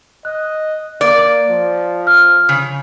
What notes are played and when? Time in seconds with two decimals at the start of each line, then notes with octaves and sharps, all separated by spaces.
0.25 D#5 F#6
1.01 A#3 D5
1.50 F3
2.07 F6
2.49 C#3